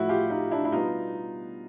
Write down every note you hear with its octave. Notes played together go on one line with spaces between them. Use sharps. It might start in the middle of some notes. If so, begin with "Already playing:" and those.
Already playing: A2 F3 A3 E4 F#4
F4 G4
D#4 F4
D4 E4
E4
B2 G3 B3 D#4 F4